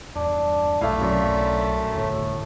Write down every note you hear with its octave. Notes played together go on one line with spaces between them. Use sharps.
E2 G2 D4
B1 C3 F#3 A3 E4 F5
F#2 D3
D1 G1 D2 A2